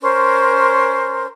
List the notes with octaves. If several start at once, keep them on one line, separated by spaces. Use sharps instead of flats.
C#4 A#4 C5 C6